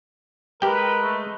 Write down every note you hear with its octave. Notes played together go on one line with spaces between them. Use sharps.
G#3 G4 A#4 B4 G5
A3